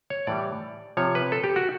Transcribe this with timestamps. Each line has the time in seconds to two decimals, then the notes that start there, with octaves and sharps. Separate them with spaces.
0.10 C#5
0.27 A2 E3 G3 D5
0.97 C3 F3 C#5
1.15 B4
1.32 A4
1.44 G4
1.56 F#4